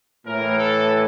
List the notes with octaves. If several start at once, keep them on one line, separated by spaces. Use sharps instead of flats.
A2 E3 A#4
A4